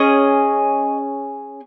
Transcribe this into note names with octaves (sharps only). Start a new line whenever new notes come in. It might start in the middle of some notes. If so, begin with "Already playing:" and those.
Already playing: C#4 G#4 D#5